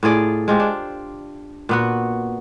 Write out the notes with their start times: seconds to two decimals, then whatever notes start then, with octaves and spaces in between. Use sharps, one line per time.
0.03 A2 F4 G#4 D5
0.48 G#3 F4 G4 C5
0.60 D4
1.69 A#2 B3 F#4